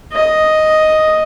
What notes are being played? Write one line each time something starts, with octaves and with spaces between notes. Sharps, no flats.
D#5